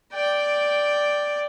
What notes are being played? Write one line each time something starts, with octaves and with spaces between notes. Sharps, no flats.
D5 G5